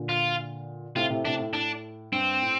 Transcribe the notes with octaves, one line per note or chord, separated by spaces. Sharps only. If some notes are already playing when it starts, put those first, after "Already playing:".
Already playing: A#2 D3
F4
A2 C3 F4
A2 C3
A2 C3 D4
A2
A2 D4
G2 C4
A2